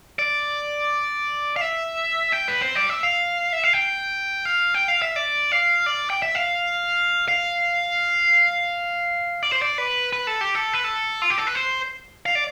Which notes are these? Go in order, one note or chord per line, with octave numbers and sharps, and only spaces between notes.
D5
F5
E5
G5
B4
C5
D5
E5
F5
E5
F5
G5
F5
G5
F5
E5
D5
F5
D5
G5
E5
F5
F5
D5
C5
D5
B4
B4
A4
G4
A4
B4
A4
F4
G4
A4
B4
C5
F5
D5